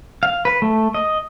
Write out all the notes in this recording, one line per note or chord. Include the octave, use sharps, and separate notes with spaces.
F5
B4
A3
D#5